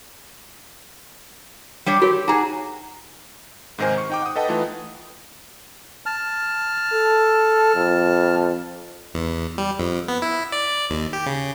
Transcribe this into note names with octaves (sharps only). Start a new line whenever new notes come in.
G3 D4 C#5
F#4 G4 A#4 C#5
D#4 F#4 G#4 A#5
G#2 C3 D#3 A#4 C5 G#5
C#6
D#4 G5 D6
F#5 D#6
A4 B4 D#5 F#5 G5 A5
E3 A3 D#4 F4 B4
A5 F6
A4
F2
E2
G3
F2
B3
E4
D5
D#2
G4
C#3